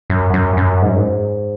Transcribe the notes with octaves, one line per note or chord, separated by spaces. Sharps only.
F#2
F#2
F#2
G#2
F#2
G#2